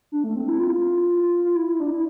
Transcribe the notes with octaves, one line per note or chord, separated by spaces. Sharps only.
D4
A3
C4
E4
F4
F4
E4
E4
D4
E4